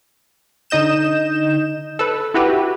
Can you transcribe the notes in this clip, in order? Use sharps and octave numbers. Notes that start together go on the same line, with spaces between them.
D3 D#4 D#5 G6 E7
A4 B4
E4 F#4 G4 B4